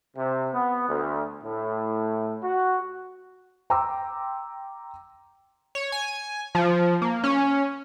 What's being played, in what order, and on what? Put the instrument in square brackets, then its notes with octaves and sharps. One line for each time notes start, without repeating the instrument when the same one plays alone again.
[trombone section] C3
B3
D2
A2
F#4
[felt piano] G5 A#5 C6 D6 E6
[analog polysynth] C#5
G#5
F3
A#3
C#4